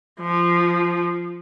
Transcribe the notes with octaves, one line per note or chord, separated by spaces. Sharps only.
F3